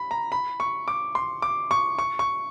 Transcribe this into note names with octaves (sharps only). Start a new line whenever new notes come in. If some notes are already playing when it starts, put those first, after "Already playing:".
Already playing: B5
A#5
B5
C#6
D6
C6
D6
C#6
C#6
C#6